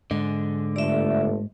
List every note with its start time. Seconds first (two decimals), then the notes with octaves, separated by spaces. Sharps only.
0.11 G#2 D3 G#3 D#5
0.76 G1 A3 D5 E5